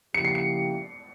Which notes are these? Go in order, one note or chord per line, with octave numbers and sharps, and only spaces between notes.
C#3 F3 A#3 E4 G4 C#7
C7
C#7